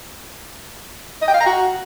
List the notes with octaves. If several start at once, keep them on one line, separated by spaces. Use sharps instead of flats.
D#5
G5
F5
A#5
F#4